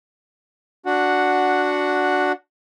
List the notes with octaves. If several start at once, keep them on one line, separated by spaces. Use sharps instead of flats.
D4 F#4 F#5